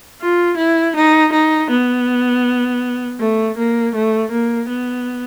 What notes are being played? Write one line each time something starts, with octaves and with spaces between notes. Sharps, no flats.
F4
E4
D#4
D#4
B3
A3
A#3
A3
A#3
B3